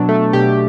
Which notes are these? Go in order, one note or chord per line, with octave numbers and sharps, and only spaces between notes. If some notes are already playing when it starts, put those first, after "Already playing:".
Already playing: B2 F#3 D4
A3
B2 G4